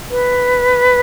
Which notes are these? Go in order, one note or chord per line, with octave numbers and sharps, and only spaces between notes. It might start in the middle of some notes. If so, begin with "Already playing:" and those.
B4